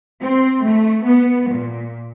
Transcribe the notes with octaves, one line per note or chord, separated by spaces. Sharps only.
C4
A3
B3
A#2